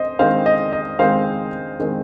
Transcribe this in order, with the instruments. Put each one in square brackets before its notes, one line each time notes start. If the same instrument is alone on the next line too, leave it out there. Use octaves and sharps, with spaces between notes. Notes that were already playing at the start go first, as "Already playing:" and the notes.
Already playing: [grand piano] C4 C5 D#5
D#3 G#3 C4 C5 F5
D#5
D#5
D#3 G#3 C4 C5 F5
D#3 G#3 C4